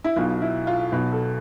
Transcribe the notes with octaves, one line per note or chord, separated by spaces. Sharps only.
E4
B1 B2 F4
E4
F4
B1 B2
A4